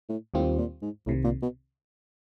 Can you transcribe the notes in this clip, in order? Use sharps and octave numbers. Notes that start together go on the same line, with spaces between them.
A2
D#2 A2 D#3 G3 C4 F4
A#2
G#2
C2 A2 C3 D#3
A#2
B2